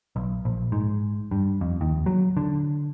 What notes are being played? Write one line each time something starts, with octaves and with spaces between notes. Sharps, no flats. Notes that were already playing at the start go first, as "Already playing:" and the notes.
B1
A#1
G#2
G2
F2
D#2
F#3
D3